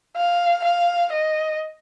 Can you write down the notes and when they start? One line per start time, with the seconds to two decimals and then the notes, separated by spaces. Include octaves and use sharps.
0.16 F5
0.64 F5
1.12 D#5